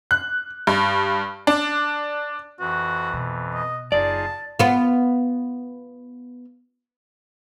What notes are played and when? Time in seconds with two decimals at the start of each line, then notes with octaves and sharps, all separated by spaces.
0.11 F#6
0.67 G2
1.47 D4
2.60 F2 E3 F#4
3.13 B2
3.55 D#5
3.92 F#1 D#4 F4 G#4 D5 A5
4.59 B3 F4